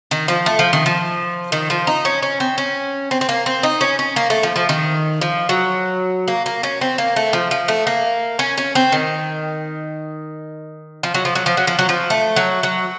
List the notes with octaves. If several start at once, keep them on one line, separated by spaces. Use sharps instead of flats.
D#3
F3
A3
F3
D#3
F3
D#3
F3
D#4
C#4
C#4
C4
C#4
C4
C4
A#3
C4
D#4
C#4
C#4
A#3
A3
F3
F3
D#3
F3
F#3
A#3
A#3
C#4
C4
A#3
A3
F3
F3
A3
A#3
C#4
C#4
C4
D#3
F3
F#3
F3
F#3
F3
F#3
F3
F#3
F3
A3
F#3
F#3